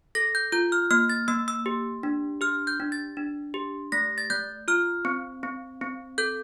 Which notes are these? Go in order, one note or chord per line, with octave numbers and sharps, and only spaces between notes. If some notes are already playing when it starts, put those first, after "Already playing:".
A4 A#6
G6
F4 G6
F6
A#3 F6
A6
A#3 E6
E6
G4
D4
G4 F6
G6
D4
A6
D4
G4
A3 A#6
A6
A3 G6
F4 F6
C4
C4
C4
A4 G6